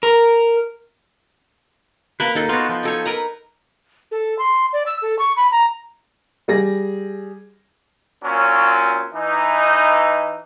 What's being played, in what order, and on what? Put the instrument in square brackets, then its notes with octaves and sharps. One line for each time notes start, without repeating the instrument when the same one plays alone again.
[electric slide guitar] A#4
[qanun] A#3 A#4 F#5 [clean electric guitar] B4
[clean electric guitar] D#2 [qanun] D#4 A4
[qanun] B3 [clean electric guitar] F4 F#4
[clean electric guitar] F3
[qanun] D#4 A4 C#5
A#4 B4 A#5
[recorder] A4
C6
D5
E6
A4
C#6
B5
A#5
[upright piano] G3 G#4 A#6
[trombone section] A#2 F#3 C4 C#4 F4
E3 D#4